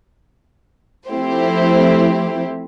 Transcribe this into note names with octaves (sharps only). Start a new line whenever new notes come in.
F3 A3 C4 E4 G4 C5